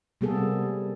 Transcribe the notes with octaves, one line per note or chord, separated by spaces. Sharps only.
C3 G3 A#3 B3 G#4 A4